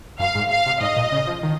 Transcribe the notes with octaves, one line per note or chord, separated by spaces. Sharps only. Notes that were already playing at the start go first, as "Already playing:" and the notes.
F#2 F5
G#2
F5
C3
G#2 D#5
A#2
C#3
F3
D#3